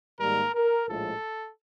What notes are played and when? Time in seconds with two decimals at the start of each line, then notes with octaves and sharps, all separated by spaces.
0.20 G#2 D#3 G3 A#3 A#4
0.54 A#4
0.88 A#1 A2 F3 G#3 A4